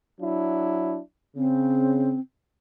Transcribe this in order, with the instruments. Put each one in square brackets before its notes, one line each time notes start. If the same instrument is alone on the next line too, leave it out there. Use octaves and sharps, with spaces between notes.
[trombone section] F#3 D4 E4
[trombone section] C#3 [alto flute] C4